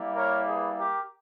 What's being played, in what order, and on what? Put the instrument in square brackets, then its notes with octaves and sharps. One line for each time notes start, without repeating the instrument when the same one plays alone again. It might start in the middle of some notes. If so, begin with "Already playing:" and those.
Already playing: [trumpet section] G3 A#3 E4
A#4 C#5
G#4 B4
G4 A#4